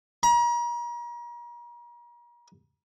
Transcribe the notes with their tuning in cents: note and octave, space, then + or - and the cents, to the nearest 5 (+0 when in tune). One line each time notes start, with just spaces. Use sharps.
A#5 +40